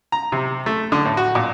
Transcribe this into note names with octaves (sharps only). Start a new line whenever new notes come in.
A#5
C3
A3
D3
A2
F#4
A#2